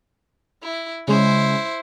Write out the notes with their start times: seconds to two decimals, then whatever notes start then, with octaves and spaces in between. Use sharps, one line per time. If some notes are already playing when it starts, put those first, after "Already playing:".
0.63 E4
1.08 C#3 G#3 C#4 E4 C5